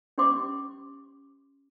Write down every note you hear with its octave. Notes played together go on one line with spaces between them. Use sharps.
C#4 G4 E5 C6 D6